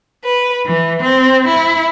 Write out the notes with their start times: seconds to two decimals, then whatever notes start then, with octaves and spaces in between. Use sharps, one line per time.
0.23 B4
0.66 E3
1.02 C4
1.47 E4